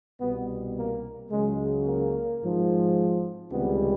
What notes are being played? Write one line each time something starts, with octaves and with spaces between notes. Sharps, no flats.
C2 B2 G3 B3
A#3
C#2 C#3 F#3 G#3
A#3
G#1 G#2 F3
C#2 C3 D#3 G3 B3